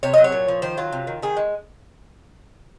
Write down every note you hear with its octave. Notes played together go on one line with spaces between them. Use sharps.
C3 C#5
F#3 D#5
C#5
A#2
F3
D#3 C5
F#3 F4
C3
D#3
D#3 G#4
G#3